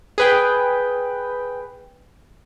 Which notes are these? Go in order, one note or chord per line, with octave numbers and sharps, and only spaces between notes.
G#4 B4 G5